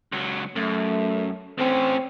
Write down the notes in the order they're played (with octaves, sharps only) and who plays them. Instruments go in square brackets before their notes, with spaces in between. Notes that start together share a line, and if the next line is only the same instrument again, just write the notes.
[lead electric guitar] C#2 F#3
[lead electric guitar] F#2 [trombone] A3
[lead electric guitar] A2 C#4 [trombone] C4